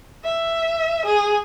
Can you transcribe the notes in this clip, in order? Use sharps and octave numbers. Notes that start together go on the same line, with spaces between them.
E5
G#4